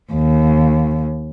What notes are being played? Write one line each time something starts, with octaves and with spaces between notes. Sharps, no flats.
D#2